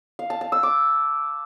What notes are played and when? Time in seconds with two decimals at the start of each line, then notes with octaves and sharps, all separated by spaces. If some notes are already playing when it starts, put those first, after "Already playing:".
0.19 F5
0.30 A5
0.41 A5
0.52 E6
0.63 D6